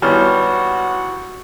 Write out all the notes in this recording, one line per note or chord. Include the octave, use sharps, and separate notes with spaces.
G#1 G3 B3 E4 F#4 C#5 F6